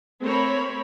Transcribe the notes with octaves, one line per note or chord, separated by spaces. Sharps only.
A3 C4 A#4 C5 C#5 B5